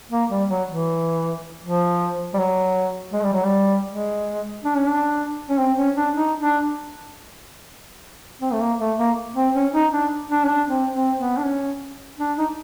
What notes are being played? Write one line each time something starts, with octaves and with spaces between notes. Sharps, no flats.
A#3
G3
F#3
E3
F3
G3
F#3
G#3
G3
F#3
G3
G#3
D4
C#4
D4
C#4
C4
C#4
D4
D#4
D4
C4
A3
A#3
A3
A#3
C4
C#4
D#4
D4
D4
C#4
D4
C4
C4
B3
D4
C#4
D4
D#4